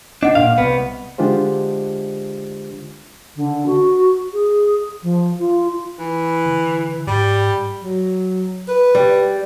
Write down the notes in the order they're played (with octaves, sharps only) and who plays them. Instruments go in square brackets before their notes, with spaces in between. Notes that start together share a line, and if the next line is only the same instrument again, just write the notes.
[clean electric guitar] D4 [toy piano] D#5 F#5
[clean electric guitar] A#2 F5
C2 B3
[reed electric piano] D3 G#3 D4 F4 G4 C5
[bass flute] D3
F#4
G#4
F3
F4
[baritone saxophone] E3
[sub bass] D3
[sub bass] G#2 [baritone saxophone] G3
[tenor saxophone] F#3
B4
[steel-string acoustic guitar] G3